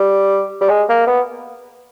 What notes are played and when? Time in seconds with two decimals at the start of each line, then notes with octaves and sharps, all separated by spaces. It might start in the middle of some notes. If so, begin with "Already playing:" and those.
Already playing: G3
0.61 G3
0.69 G#3
0.89 A#3
1.07 B3